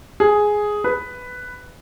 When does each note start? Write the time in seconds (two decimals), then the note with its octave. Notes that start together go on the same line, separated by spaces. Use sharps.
0.20 G#4
0.84 B4